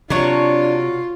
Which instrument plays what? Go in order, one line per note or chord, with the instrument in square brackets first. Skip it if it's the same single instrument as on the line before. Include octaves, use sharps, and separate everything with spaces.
[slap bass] C3 [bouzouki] F#3 C#5 [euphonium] D4 [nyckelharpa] F4